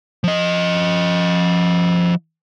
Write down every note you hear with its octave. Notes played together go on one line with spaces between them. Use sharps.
F3 D#5